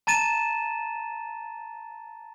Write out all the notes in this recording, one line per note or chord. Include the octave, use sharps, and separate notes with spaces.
A5 A#5 A6 D#7 E7